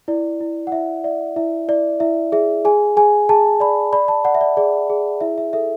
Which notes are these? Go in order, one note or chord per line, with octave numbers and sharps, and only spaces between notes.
E4 D5
E4
F#5
E4 E5
D5 E5
E4 E5
E4 D5
E4 E5
G#4 E5
G#4 G#5
G#4 G#5
G#4 A5
D5 B5
D5 B5
A5
D5 F#5
E5
D5
G#4 D5
G#4
E4 E5
E5
A4 E5